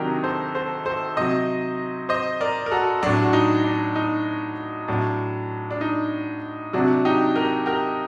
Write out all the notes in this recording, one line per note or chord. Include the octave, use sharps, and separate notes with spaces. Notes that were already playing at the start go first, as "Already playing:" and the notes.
Already playing: C3 D#3 F#3 D4 D#4 F#4 G4 A#4
A4 C5
A4 C5
A4 C5
C3 F#3 C5 D#5
C5 D#5
A#4 D5
A#4
F#4 A4
A2 F#3 D4 F#4
F#4
D#4
D4
D#4
A2 F#3 D4
D4
D#4
C3 F#3 D4 F#4
D#4 G4
G4 A#4
G4 A#4